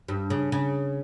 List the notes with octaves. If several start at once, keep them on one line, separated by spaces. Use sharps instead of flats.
G2
C#3
C#3